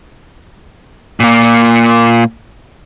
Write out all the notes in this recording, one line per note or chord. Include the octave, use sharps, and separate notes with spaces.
A#2 A#3